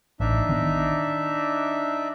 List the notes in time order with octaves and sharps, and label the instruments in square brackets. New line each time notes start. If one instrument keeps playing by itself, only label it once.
[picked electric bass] A1 [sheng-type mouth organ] D4 D#4 E5
[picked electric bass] D#3 B3